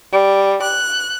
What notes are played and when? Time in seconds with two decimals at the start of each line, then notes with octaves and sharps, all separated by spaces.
0.12 G3
0.63 F#6